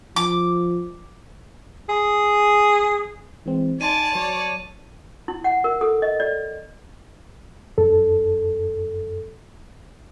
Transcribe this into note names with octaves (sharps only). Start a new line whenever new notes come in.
F3 D6
G#4
E3 G#3 C4
D#4 D5 G#5 A5 C6 A6 D#7
F#3 C#5 D5
E4
F#5
A#4
A4
D#5
D5
F#2 A4